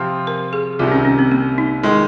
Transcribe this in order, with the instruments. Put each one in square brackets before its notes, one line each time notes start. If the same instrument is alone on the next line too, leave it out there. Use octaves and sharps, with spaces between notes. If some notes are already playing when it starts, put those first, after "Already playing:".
Already playing: [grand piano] C3 F3 C4 F4
[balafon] A#4
G#4
[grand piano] C2 C3 D#3 [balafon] F4
[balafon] C#4
C#4
C4
A#3
D#4
[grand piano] D#3 G#3